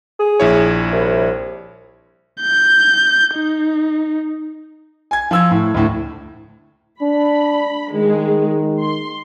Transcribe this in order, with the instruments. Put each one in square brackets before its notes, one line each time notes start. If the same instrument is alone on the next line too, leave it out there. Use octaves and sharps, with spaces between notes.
[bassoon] G#4
[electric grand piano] A#1 E4 C#5
[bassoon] C2
[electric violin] G6
D#4
[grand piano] G#5 G#6
F3 E6 G#6
A2
D2 A2
[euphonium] D4 [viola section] B5
[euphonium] D#3 [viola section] G#3
[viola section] C6